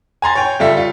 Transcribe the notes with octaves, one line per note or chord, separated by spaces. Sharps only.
G#5 A#5 C6 A6
C#5 G5
F#1 G3 F4 A4 E5 B6
F4